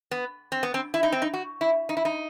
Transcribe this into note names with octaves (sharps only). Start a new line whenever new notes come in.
B3
C4
B3
C4
E4
D#4
C4
D#4
F#4
E4
D#4
E4
D#4